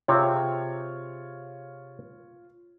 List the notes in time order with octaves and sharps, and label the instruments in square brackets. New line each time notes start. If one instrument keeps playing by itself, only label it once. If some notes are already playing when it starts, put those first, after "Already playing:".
[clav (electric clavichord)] C3 C4 G#4 [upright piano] F4 C#5